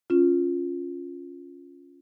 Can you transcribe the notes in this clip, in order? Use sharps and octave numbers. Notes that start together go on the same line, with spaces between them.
C#4 F4